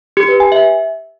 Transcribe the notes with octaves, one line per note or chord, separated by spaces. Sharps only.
G4
B4
G#5
E5